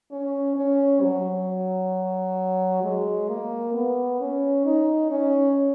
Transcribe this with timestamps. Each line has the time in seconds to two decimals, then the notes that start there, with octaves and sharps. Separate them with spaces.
0.11 C#4
0.56 C#4
1.02 F#3
2.84 G#3
3.29 A#3
3.74 B3
4.20 C#4
4.66 D#4
5.11 C#4